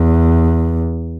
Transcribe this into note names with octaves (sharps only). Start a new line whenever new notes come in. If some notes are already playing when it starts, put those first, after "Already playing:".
Already playing: E2